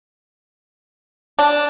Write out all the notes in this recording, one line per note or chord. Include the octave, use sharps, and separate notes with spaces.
D4